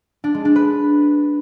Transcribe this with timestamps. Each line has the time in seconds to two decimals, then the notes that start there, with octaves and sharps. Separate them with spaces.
0.24 D4
0.34 G#3
0.45 D4
0.56 B4